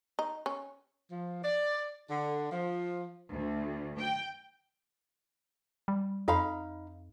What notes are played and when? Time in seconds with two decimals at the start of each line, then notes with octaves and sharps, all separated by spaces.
0.19 D#4
0.46 C#4
1.10 F3
1.44 D5
2.09 D3
2.51 F3
3.30 D2
4.00 G5
5.88 G3
6.28 F2 D#4 F5 B5